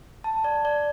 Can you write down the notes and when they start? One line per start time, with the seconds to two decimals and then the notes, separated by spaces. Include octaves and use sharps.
0.24 A5
0.44 D5
0.65 D5